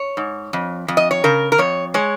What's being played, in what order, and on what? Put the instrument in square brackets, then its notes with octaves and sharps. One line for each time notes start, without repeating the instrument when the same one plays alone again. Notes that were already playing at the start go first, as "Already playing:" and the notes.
Already playing: [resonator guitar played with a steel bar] C#5
G#2
F2
F2
D#5
C#5
C#3 A#4
A#4
F2 C#5
G#3 C#5